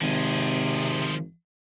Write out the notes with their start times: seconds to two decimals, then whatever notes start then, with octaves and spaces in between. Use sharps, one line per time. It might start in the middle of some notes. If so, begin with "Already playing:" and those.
0.01 G#1 C3 D#3 F3 G#4